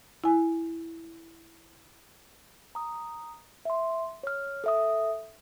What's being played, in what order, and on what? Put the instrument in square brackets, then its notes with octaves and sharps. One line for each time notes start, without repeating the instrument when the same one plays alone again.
[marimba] E4 G#5
[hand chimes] A#5 D#6
E5 C6
C#5 F6
A4 E5 D#6